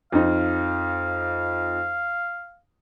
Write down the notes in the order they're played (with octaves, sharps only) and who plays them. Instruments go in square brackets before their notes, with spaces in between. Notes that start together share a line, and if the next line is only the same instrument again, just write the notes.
[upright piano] F2 D#4 [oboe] F5